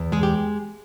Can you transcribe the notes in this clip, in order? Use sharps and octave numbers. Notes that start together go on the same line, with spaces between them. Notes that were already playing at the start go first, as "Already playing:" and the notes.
Already playing: E2
G#3 G#4
G4